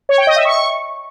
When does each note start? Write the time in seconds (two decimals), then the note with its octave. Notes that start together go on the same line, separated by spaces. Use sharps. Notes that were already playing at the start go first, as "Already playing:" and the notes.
0.09 C#5
0.18 G5
0.27 D#5
0.36 E5
0.45 C#6